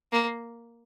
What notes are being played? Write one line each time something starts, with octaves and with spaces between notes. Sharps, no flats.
A#3